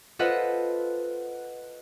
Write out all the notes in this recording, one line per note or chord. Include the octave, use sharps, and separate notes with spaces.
F4 A4 B4 C5 D#5 F#5